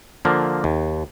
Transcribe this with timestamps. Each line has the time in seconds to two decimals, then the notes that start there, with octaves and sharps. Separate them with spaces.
0.25 D3 F3 A#3
0.64 D#2